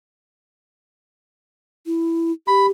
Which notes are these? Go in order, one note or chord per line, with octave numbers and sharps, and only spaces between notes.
E4
G4 B5